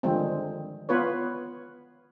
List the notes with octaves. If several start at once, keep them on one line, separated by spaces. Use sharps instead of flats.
D3 D#3 F3 G3 G#3 C4
B3 F4 B4 C#5